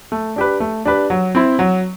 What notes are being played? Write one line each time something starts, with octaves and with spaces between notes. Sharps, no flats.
A3
D4 G4 B4
A3
D4 G4 B4
F#3
C4 E4
F#3